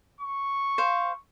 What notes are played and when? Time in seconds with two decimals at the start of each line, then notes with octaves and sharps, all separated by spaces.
0.21 C#6
0.78 C5 F5